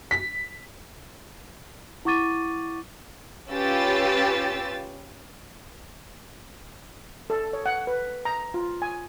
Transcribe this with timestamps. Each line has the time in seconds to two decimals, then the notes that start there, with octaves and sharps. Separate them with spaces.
0.11 B6
2.05 E4 F#5 C#6 D6 A6 D#7
3.50 C#4 F4 G4 B4 E6 A6
7.30 A4
7.53 C#5
7.66 F#5
7.87 B4
8.25 A#5
8.54 F4
8.82 G#5